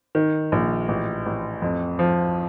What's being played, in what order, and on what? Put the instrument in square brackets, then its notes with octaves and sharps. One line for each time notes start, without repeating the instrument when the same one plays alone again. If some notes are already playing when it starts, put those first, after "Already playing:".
[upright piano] D#3
A#1
A1
A1
F2
F3